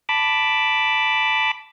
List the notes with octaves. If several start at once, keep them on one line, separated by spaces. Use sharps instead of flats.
A5 B5 D6